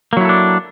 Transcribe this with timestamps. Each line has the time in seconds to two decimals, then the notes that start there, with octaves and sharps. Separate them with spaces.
0.13 A#3
0.17 F#3
0.21 E4
0.25 A4
0.29 D4